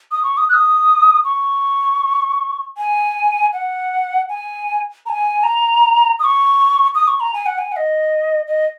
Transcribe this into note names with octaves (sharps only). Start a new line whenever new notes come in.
D#6
C#6
D#6
F#6
D#6
C#6
G#5
F#5
G#5
A#5
G#5
A#5
D#6
C#6
D#6
C#6
A#5
G#5
F#5
G#5
F#5
D#5
D#5